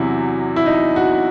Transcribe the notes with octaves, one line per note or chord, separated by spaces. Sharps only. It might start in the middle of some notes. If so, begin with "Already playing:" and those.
Already playing: E2 C3 F#3 E4
E4
D#4
F#4